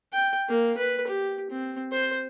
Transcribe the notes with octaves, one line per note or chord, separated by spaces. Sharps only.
G5
A#3
B4
G4
C4
C5